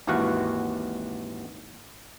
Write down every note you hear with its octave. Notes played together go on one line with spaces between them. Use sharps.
G#1 D#2 E3 F#4 F5 F#5